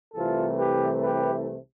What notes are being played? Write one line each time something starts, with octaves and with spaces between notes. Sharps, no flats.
C2 C3 E3 A3 F4 A4
G4 B4
G4 B4